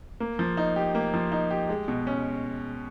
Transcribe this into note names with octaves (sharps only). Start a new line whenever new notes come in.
A#3
F3
D#4
G4
A#3
F3
D#4
G4
G#3
B2
C#4